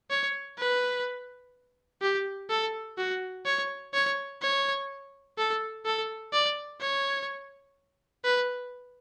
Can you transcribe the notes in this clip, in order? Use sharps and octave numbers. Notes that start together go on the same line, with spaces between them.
C#5
B4
G4
A4
F#4
C#5
C#5
C#5
A4
A4
D5
C#5
B4